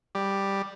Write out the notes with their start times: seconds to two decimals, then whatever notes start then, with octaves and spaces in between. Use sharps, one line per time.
0.15 G3